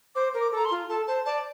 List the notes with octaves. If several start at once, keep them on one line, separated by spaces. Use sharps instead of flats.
C5 D6
A#4
D6
A4 A#5
C6
F4
A4 A5
C5 A5
D5 A5